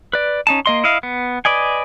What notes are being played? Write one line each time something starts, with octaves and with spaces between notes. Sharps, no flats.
B4 D5
C#4 D#4 A5
A#3 D#5 C6
E4 D#5 F5
B3
B4 D5 D#5 G#5